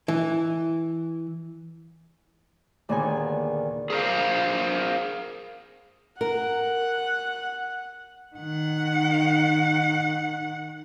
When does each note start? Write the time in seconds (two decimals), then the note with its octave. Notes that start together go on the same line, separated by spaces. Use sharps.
0.08 E3
2.89 D#2 A#2 D3 B3 G#4 G#5
3.90 G#4 A#4 C5 F5
6.21 A#4 F#5
8.36 D#3 F#5